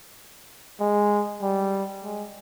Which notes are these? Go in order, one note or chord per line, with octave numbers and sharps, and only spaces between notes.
G#3
G3
G#3